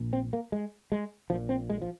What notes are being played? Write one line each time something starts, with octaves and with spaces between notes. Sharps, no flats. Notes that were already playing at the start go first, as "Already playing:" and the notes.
Already playing: A#1 A#2
C4
A#3
G#3
G#3
A#1 A#2 F3
C4
G#3
F3